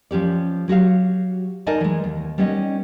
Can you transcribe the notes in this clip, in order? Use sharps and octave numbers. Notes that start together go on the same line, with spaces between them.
F3 C#4 G4 D5
F#3 F#4 G4 F5
D#4 A#4 D5 D#5 G#5 A5
E3 G#3
D#2
G3 B3 C#4 D#4 D#5